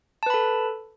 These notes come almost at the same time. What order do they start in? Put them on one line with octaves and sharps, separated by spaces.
A5 B4 B5 A4